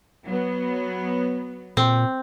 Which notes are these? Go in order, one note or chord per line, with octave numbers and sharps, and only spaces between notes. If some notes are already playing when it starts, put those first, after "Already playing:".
F#3 B3
A#2 C4